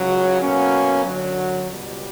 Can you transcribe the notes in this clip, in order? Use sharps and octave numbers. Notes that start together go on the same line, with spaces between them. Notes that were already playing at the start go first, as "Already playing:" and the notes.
Already playing: C#2 C#3 F#3
B2 F#3 A#3 C#4
F#2 D3 F#3
C#2 B2 G3